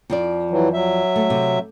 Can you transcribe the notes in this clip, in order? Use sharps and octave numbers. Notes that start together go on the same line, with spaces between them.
F2 F3 D5
E3 F#3
F#3 E5
A3
C3